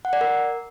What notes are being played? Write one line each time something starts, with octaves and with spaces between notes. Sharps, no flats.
F#5
D5
A#4